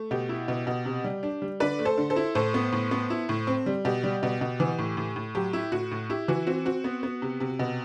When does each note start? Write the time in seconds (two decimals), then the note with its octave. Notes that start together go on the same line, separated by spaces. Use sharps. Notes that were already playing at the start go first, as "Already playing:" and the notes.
Already playing: A3
0.11 B2 G4
0.29 E4
0.48 B2
0.67 B2
0.85 C3
1.04 G3
1.23 D4
1.42 G3
1.60 D3 B4 D5
1.79 A3
1.85 A4 C5
1.98 D3
2.10 A4 C5
2.16 E4
2.35 A2 A4 C5
2.54 B3
2.72 A2
2.91 B3
3.10 E4
3.29 A2
3.47 C4
3.66 G3
3.85 B2 G4
4.04 G3
4.23 B2
4.41 B2
4.60 E3
4.79 A2
4.97 A2
5.16 A2
5.35 F#3 G4
5.53 E4
5.72 A2 F#4
5.91 A2
6.10 E4 G4
6.28 E3 F#4
6.47 C4 F#4
6.65 C4 F#4
6.84 B3
7.03 B3
7.22 C3
7.40 C3
7.59 B2